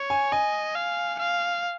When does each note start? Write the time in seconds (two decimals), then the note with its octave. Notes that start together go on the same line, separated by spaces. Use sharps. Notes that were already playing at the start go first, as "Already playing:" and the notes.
Already playing: C#5
0.10 G#5
0.32 D#5 G#5
0.75 F5
1.19 F5